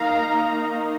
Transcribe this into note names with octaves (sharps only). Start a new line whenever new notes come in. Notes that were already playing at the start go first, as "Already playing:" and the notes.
Already playing: D#3 A#3 D#4 F5 A#5